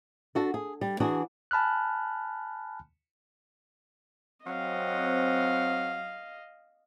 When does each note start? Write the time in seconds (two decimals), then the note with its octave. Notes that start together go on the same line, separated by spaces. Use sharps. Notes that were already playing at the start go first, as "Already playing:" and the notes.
0.35 D4 F#4 A4
0.54 G#4
0.81 G3
1.00 E3 D4 F#4 G#4
1.51 G#5 A5 B5 F6 F#6
4.47 F#3 C4 D#5 F5